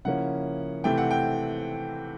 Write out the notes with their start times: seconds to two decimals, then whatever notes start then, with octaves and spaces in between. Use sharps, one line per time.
0.05 C#3 F3 A#3 C#4 E4 F#5
0.84 C3 E3 A3 C4 G5
0.98 F#5
1.11 G5